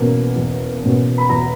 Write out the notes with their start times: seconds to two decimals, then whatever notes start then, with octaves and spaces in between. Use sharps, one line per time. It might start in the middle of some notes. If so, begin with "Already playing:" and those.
Already playing: E2 B2 A#3 C#4
0.36 E2
0.82 B2 A#3 C#4
1.18 B5
1.29 E2 A#5